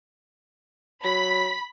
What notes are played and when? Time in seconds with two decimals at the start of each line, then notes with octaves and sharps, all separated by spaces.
1.04 F#3 B5 B6